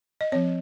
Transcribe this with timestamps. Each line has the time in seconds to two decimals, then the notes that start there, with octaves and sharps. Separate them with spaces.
0.21 D#5
0.32 F3 C4 C#5